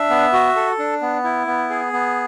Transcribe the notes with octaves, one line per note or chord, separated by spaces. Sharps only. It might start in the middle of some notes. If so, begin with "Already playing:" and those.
Already playing: D4 E5
B3
F#4
A4
D4
B3
E4
B3
G#4
B3